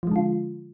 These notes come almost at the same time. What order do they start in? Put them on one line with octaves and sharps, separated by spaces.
F3 G#3 D3 F4